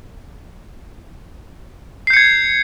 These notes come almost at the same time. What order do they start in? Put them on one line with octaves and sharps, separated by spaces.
C7 G6 C#7 G#6